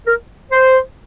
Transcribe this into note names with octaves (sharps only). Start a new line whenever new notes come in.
A#4
C5